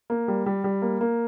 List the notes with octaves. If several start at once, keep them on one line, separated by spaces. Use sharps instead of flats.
A#3
G3
G3
G3
A#3
A#3